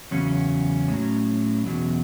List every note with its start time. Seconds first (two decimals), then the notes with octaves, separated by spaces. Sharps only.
0.11 E2 C#3 F#3 C#4
0.88 A2 F#3
1.66 E2 B2 F#3